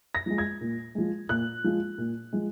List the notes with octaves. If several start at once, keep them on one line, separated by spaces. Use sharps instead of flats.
A#6
F3 G#3
G#6
A#2
F3 G#3
A#2 F#6
F3 G#3
A#2
F3 G#3